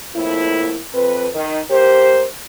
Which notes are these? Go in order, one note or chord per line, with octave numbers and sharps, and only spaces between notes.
F2 A2 A#3 E4
F2 C4 B4
D#3
A#3 G4 C5